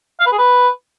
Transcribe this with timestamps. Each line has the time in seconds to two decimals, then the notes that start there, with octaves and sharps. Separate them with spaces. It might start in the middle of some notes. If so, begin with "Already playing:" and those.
0.20 F5
0.26 B4
0.32 G#4
0.38 B4